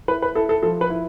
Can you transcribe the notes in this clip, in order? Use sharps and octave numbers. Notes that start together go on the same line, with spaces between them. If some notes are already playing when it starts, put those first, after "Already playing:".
E4 B4
B4
E4 A4
A4
F3 A4
B4
E4